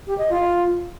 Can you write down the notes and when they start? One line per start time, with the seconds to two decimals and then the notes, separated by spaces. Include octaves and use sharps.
0.07 G4
0.18 D#5
0.30 F4